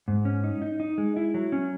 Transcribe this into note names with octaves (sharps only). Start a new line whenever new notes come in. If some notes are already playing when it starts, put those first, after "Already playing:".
G#2
C#4
D#4
D#4
D#4
G#3
E4
F#3
C#4